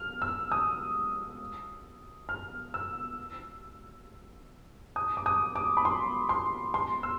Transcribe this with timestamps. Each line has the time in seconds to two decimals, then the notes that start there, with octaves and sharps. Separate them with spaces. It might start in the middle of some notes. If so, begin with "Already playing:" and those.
Already playing: F6
0.22 E6
0.52 D#6
2.29 F6
2.74 E6
4.96 D#6
5.17 D6
5.26 D#6
5.56 D6
5.77 B5
5.85 C6
6.29 C6
6.74 C6
7.03 E6